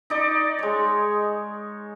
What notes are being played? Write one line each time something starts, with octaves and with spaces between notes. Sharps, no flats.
D#4 D5
G#3 C#5